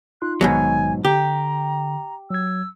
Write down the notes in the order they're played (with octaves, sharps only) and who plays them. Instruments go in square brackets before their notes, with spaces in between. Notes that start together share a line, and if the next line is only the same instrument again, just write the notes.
[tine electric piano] D#4 F4 C6 [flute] F#6
[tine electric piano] A#1 D#3 [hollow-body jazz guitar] G#2 B2 F#3 [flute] G#5
[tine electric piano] D3 [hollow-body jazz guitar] G4 [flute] A#5
[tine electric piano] F#3 G#6 [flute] E6